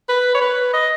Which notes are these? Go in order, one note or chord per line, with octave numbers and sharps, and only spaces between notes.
B4
C#5
B4
D#5